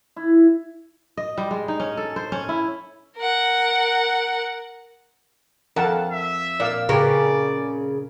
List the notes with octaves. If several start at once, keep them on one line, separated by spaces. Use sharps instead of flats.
E4
D#5
G3
G#3
D#4
C#4
A4
C5
C#4
E4
A#4 F#5
F2 A#4 F#5 A5
E5
A#2 D5 F5 E6
C#3 G4 A#4 B4 D5